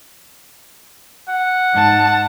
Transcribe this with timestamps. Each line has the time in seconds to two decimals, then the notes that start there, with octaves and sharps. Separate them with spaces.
1.28 F#5
1.72 G#2 A5